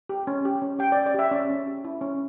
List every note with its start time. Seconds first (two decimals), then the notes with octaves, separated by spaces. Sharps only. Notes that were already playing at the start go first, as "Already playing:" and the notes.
0.09 G4
0.27 C#4
0.45 G4
0.62 C#4
0.79 G4 G5
0.92 C#4 D5
1.06 D5
1.14 G4 E5
1.31 C#4 D5
1.50 C#4
1.67 G4
1.84 E4
2.01 C#4